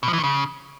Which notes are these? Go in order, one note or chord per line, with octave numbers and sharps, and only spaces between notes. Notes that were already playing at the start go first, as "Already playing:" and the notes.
B2
F3
E3
D#3
C#3